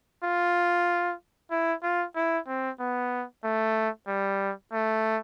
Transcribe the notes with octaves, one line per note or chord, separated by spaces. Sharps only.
F4
E4
F4
E4
C4
B3
A3
G3
A3